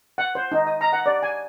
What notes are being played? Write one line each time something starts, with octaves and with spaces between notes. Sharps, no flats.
F#5
C5
D#4
D#6
A#5
F#5
D5
G#5